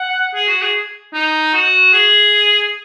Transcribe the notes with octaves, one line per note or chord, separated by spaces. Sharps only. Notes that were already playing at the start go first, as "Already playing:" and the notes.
Already playing: F#5
G#4
F#4
G#4
D#4
F#4
G#4